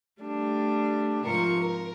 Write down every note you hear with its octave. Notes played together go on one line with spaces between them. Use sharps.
G3 A3 D4
G#2 C3 F3 A#4 C#6
A#4